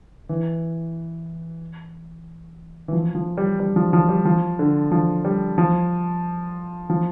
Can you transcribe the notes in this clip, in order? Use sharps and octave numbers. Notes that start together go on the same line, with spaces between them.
E3
E3
F3
F3
G3
G3
F3
F3
G3
F3
D3
F3
G3
F3
F3